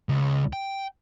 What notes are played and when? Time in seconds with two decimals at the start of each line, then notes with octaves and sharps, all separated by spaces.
0.09 C#2
0.53 G5